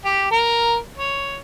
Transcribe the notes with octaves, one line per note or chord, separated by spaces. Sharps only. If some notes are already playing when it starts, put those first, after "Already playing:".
G4
A#4
C#5